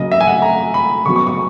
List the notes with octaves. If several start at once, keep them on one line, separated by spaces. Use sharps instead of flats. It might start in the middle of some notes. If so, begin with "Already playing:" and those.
Already playing: C#3 F#3 A#3 D#5
E5
G#5
F#5
A#5
B5
C#3 F#3 B3 C#6
C#6
C#6